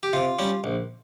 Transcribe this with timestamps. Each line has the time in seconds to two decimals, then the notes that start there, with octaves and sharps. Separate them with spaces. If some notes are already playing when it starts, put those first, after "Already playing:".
0.03 G4
0.13 C3 F4
0.39 G3 C#4
0.64 A#1